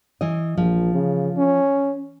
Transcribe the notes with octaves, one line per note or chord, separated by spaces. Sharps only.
E3 D#5
A#1 F3
C#3
C#4